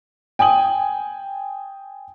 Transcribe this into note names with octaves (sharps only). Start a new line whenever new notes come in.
G5 G#5 D#6 F#7